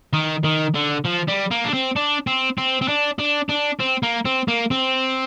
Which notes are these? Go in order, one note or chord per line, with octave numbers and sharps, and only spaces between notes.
D#3
D#3
D3
F3
G3
A#3
D4
C4
D4
C4
C4
C4
D4
D4
D4
C4
A#3
C4
A#3
C4